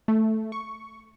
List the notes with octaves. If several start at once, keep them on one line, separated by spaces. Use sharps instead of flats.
A3
C#6